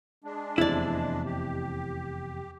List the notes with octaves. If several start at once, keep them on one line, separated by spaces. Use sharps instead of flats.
G#3 D4
F1 E2 C3 E4 D5
G4